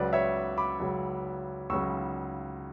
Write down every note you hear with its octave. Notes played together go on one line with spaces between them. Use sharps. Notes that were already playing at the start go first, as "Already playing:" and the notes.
Already playing: C#2 C#3 F#3 B4 D5
C#5 E5
B5 D6
C#2 C#3 F#3
C#2 C#3 F#3 C#6 E6